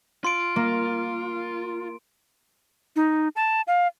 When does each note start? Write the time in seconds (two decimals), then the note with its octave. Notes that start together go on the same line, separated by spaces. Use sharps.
0.25 F4 C6 D7
0.56 A#3
2.96 D#4
3.36 A5
3.67 F5